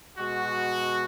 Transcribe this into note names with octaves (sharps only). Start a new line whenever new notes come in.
B2 G#3 F#4